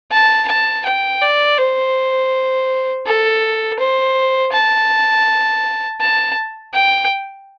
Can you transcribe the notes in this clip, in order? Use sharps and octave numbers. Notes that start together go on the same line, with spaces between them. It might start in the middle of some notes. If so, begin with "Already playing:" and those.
A5
A5
G5
D5
C5
A4
C5
A5
A5
G5